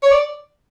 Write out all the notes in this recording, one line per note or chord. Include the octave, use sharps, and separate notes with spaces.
C#5
D5